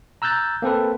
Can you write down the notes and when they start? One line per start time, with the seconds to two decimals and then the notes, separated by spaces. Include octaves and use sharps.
0.22 A#5 E6 F#6 G6 A6
0.62 A#3 C4 A4 B4